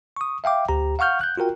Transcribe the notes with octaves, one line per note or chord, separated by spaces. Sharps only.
C#6 D#6
E5 F5 G5 D6
D2 G4 A#5
F5 F#5 C#6 F6 G6
F#6 G6
F4 F#4 A#4 G5